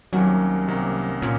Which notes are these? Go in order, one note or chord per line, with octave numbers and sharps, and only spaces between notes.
C2 C3 D#3 F#3 A#3 C#4
C2 C3 D#3 A#3 C#4
A#2 A#3 C#4